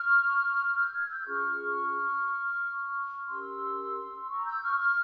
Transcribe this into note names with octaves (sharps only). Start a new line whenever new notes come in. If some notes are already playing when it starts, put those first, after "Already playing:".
Already playing: C#6 F6
E6 G6
F6 G#6
E6 G6
C#4 F4 G#4 C#6 F6
C#4 G4 A#4 C6 E6
A#5 C#6
E6 G6
C#6 F6
C#6 F6